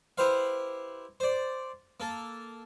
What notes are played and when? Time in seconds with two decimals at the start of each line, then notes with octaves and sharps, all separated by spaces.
0.18 E4 G4 B4 C5 F5
1.20 C5 D5
2.00 A#3 A4